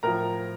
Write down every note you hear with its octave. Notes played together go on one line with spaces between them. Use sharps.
A2 F3 A#4 A#5